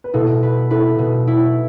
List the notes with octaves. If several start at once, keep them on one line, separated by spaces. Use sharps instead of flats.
B4
B2 E4 A4
B4
E4 A4 B4
B2
E4